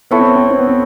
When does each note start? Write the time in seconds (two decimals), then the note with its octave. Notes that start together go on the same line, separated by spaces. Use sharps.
0.11 B3 E4 A4 C#5
0.19 C4
0.27 B3
0.36 C4
0.44 B3
0.51 C4
0.59 B3
0.67 C4